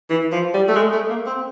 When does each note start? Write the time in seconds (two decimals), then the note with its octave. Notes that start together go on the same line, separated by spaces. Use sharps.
0.10 E3
0.32 F3
0.54 G3
0.68 A3
0.76 G#3
0.93 A3
1.10 A#3
1.26 C4